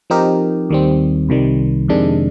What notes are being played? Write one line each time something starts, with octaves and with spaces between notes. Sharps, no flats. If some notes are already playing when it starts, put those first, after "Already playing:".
F3 C4 D#4 G4 A#4
D#2 D#3 G3 C4
C2 C3 D#3 G3
F2 C3 D#3 G#3 D4